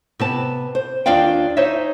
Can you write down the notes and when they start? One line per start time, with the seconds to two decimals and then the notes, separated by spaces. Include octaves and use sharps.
0.19 C3 B3 A5
0.75 C5
1.06 D#2 D4 F4 D5 F5 G5
1.57 D#4 C5 C#5 E5